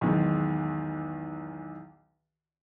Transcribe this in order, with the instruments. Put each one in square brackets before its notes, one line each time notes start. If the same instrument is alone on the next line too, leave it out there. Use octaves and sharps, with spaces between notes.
[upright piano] B1 E2 D#3 G#3